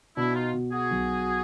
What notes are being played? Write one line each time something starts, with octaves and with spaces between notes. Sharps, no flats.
B2 D4 E4
D#4 F4
B2
F#4 G#4
B1